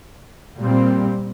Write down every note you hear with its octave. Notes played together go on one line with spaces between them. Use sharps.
A#2 G3 C4